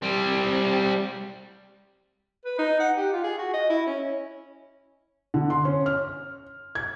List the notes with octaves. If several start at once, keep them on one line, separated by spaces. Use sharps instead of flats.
G3 C4
B4
D#4
F#5
G4
F4
G#4
F#4
D#5
E4
C#4
D3
C6
C#4
F6
G#6